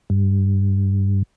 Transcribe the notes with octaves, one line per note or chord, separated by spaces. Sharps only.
G2